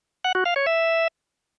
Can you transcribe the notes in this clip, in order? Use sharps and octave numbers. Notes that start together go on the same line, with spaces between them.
F#5
F#4
F5
C#5
E5